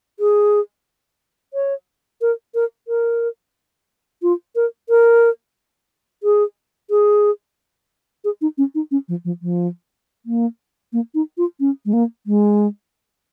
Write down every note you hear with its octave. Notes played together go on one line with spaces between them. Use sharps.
G#4
C#5
A#4
A#4
A#4
F4
A#4
A#4
G#4
G#4
G#4
D#4
C#4
D#4
C#4
F3
F3
F3
A#3
A#3
D#4
F4
C#4
G#3
A#3
G#3